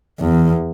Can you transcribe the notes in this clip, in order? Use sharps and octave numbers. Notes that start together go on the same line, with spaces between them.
E2